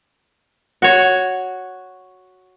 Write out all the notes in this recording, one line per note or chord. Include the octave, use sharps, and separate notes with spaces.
F#4 C#5